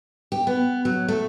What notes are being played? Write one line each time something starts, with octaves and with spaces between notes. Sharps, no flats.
G4
B3
F#3
A3